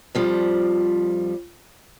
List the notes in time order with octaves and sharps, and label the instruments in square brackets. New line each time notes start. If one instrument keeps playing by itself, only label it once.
[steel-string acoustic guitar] F2 F3 G3